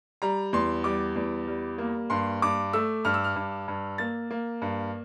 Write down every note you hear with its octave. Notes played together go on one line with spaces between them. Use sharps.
G3 A#5
E2 C6
G3 D6
E2
G3
A#3
G2 C6
G2 D6
A3 E6
G2 F6
E6
F6
G2
G2
A#3 A6
A#3
G2